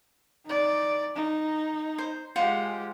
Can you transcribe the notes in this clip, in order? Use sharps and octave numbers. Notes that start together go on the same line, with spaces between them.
D#4 D5
D#4
C5
G#3 F4 G4 C5 F#5